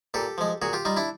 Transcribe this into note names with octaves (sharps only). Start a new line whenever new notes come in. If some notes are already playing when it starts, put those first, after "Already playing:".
A#2 G4 A4
F3 G#3
A#2 F#4 G#4
F4 G4
G3 D#4 F4
D4 E4